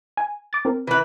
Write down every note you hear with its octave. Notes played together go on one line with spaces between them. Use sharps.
G#5
D6 A6
C4 A#4
E3 B4